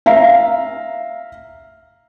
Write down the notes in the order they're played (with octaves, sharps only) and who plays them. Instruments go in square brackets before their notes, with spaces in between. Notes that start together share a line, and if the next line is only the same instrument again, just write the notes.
[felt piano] E5 F5 A#5